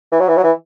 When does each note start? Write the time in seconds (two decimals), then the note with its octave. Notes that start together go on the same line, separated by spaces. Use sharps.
0.12 E3
0.20 F#3
0.28 E3
0.37 F#3
0.44 E3